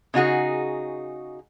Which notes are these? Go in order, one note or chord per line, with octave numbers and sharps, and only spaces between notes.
C#3 D#4 F#4 G#4